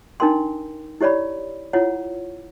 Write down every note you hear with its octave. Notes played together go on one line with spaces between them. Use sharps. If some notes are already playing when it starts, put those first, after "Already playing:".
D4 D#4 A#4 G5 C6
E4 G4 C#5 D5 B5
E4 F4 C#5 F#5